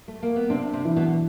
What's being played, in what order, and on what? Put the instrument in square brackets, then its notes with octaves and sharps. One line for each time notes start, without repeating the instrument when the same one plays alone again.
[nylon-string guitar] A3
A#3
B3
[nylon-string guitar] C3 C4 [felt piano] D4
[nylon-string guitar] C3 C4
[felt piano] E3
[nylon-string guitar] B2 B3